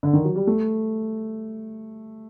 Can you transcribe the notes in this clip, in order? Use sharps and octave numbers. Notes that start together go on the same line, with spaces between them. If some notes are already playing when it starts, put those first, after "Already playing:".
D3
D#3
F#3
G3
A3